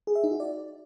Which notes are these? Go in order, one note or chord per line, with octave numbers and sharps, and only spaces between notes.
G#4
E5
D#4
F#4
D5